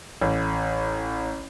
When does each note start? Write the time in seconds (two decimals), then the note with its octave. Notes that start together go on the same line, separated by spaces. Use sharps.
0.21 A1